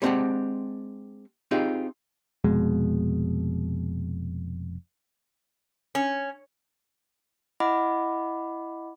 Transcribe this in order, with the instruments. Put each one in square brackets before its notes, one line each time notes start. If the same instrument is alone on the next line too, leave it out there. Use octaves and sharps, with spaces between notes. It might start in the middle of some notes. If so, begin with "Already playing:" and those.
[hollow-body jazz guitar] G3 G#3 C4 D4 G4 F#5
C4 D#4 F4 G4 G#4
[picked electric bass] F1 F2 B2 G#3
[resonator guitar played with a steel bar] C#4
[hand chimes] E4 D#5 F#5 B5 D6